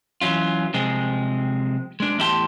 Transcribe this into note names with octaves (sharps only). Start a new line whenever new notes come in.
E3 F#3 C#4 F4
C3 F3 G#3 C4 G#4
G#3 D4
E2 A2 E4 G4 A5 C6